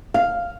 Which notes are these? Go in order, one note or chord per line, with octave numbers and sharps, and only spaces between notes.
F5